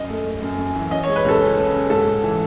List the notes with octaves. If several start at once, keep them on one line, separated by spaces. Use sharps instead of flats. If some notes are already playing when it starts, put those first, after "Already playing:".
Already playing: F#2 D#5
A3
A3
F#2
F#2
E3
C#4 D#5
C#5
G#3
B4
C#2 A4
C#4
C#3
C#4
G#2 A4
G#2
E3